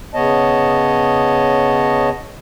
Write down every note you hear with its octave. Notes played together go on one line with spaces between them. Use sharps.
C#3 B3 C#5 D#5 A5